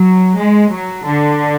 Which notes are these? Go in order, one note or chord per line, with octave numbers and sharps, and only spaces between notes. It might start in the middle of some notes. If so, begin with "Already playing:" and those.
Already playing: F#3
G#3
F#3
D3